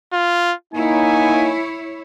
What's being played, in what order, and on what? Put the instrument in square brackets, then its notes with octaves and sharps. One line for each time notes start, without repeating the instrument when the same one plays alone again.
[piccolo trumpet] F4
[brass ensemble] A#3 D#4 [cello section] E4 C#5 [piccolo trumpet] G#5